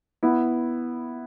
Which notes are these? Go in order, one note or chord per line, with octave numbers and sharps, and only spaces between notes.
B3 E4